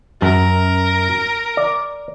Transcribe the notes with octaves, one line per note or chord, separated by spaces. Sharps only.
F#2 A#4
D5